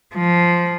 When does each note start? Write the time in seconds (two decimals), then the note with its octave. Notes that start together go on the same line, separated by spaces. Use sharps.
0.15 F3